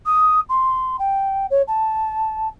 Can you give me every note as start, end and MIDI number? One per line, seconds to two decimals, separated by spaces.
0.06 0.40 87
0.49 0.96 84
0.99 1.46 79
1.50 1.62 73
1.68 2.48 81